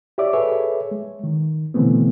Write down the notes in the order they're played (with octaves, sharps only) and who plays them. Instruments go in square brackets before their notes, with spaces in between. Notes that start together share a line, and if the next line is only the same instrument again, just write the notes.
[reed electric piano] G4 C#5 D5 E5 D6
G#4 A4 B4 C#5 E5
G#3
D#3
B2 D3 E3 A3 B3 C4